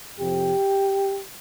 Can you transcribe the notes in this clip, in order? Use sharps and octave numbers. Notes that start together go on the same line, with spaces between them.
F2 C3 F3 G4